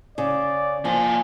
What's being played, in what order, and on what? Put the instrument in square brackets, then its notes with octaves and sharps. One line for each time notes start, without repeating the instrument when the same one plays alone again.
[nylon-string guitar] C#3 [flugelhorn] D5
[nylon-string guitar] F3 [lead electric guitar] A#3 G#5